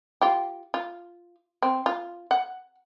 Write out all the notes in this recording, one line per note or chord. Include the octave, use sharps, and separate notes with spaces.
F4 G4
F4
C4
F4
F#5